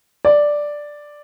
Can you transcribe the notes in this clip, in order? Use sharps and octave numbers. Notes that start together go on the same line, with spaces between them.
D5